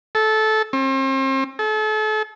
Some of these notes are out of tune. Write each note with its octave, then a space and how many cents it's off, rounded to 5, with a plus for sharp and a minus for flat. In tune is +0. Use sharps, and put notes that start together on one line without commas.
A4 -15
C4 +40
A4 -35